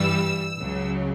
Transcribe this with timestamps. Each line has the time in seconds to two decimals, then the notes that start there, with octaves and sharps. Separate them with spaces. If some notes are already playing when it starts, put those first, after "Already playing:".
Already playing: G2 E3 G3 E6
0.57 C#2 C#3 F#3